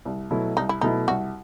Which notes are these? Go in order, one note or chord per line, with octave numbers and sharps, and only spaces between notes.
C2
B2 F#3 A3 E4
C2 D#4
E4
B2 F#3 A3 D#4 E4
C2 F#4